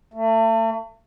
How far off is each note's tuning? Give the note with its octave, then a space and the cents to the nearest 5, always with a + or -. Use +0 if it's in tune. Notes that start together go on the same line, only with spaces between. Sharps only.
A3 +35